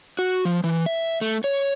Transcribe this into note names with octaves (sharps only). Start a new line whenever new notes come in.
F#4
F3
E3
E5
A3
C#5